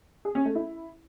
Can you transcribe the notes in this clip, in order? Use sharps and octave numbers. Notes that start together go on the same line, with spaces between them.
G#4
C#4
A3
E4